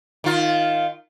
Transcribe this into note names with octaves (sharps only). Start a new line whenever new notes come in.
D#3 F4